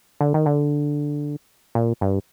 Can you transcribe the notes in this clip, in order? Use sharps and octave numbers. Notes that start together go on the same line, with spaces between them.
D3
D#3
D3
A#2
G2